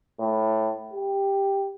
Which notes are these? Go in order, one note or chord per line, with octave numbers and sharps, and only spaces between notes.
A2
G4